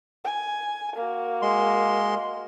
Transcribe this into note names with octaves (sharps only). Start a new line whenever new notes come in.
G#5
A#3 F#4
G#3 C6